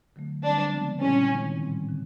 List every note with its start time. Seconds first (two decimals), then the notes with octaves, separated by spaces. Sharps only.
0.16 D3 F#3 A3
0.44 D3 G3 C4 D4
0.73 C#3 F3 G#3 B3 D4
1.01 A#2 G3 C4 C#4 E4 G#4
1.30 D#3 G#3 C4 D#4
1.59 A2 E3 G3 C4
1.89 D3